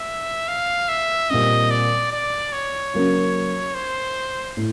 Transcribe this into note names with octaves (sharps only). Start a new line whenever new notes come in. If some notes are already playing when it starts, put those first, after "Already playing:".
Already playing: E5
F5
E5
A#2 G3 C4 D#5
D5
D5
C#5
C#3 F#3 A#3 C#4
C5
A2